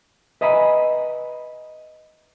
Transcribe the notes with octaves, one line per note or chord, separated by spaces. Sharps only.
B4 D#5 E5 G#5 A#5 B5